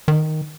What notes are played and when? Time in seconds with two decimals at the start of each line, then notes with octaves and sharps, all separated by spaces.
0.08 D#3